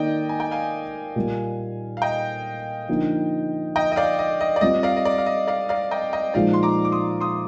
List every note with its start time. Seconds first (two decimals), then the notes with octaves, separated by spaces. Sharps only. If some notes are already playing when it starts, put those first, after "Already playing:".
Already playing: D#3 A#3 D#4 D5 D#5 G5
0.29 G#5
0.40 G5
0.51 F5 G#5
1.16 A#2 G3 A#3
1.97 F5
2.02 D#5 G5
2.89 D3 F3 A#3 D#4
3.76 D#5 G5
3.92 D#5
3.96 D5 F5
4.19 D#5
4.41 D#5
4.56 D5
4.61 G3 C4 F4 D#5
4.83 D5 F5
4.96 D#5
5.05 D5
5.18 F5
5.26 D#5
5.48 D5 F5
5.69 D5 F5
5.91 D#5 G5
6.13 D#5 G5
6.34 A#2 F3 G#3 D#4 D5 F5
6.53 C6
6.63 A#5 D6
6.85 D6
6.92 C6 D#6
7.21 C6 D#6